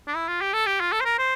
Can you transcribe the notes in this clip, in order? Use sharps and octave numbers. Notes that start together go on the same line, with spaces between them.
D4
E4
F4
G4
A4
G4
F4
A4
C5
A#4
C5